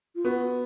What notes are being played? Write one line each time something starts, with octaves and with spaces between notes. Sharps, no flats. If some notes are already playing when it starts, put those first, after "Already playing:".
F4
B3 F#4